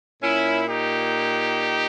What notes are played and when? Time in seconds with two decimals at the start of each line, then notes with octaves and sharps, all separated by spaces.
0.23 A#2 C#4 E4
0.68 D#4 G4